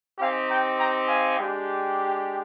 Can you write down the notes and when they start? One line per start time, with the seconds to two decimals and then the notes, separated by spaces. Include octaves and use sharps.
0.19 C4 D#4 G4 F5 G#5
0.48 G5 A#5
0.78 G5 A#5
1.06 F5 G#5
1.37 G#3 D4 G4